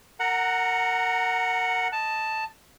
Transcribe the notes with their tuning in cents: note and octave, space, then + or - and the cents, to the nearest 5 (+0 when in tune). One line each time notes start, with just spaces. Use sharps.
A#4 -25 F#5 +0 A#5 +0
D#5 +0 A5 +5